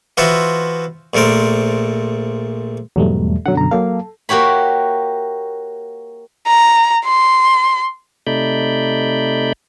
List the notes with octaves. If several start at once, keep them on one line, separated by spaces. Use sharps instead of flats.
E3 F4 F#4 C5 D#5 E5
A#1 A#2 A3 A#4 C5
E2 G#2 B2 F#3 G3 A3
F#2 B2 D3 F#3 F#5
A#5
F#3 A#3 A4 F5
A#3 F#4 G4 C#5 B5
A#5
C6
C3 A3 D#4 D5 B5 G6